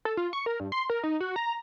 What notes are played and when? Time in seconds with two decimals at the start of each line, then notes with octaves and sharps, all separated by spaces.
0.05 A4
0.17 F4
0.33 C#6
0.46 A#4
0.60 G2
0.72 C6
0.90 A#4
1.03 D#4
1.20 F#4
1.36 A#5